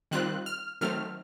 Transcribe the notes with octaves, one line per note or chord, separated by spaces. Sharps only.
D#3 G3 C4 F4 F#6
F6
D#3 F#3 A3 C4 F6